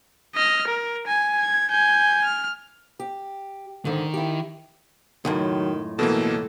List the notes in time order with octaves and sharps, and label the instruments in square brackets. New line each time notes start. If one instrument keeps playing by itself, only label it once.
[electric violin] D#5 F6
A#4
G#5
G#6
G#5 G6
F6
[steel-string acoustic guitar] G4
[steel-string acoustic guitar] G#2 D3 [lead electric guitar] D#3
[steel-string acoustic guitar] E4 G4
[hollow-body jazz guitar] C#2 F#2 A2 [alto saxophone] D#3 [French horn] F#3
[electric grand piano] B2 E3 A#3 [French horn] A3 [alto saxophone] A4